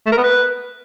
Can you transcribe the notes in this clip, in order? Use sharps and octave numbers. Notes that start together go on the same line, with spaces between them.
A3
A#4
B3
B4